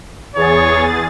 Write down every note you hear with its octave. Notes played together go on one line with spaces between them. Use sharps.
E2 G#4 C#5 A6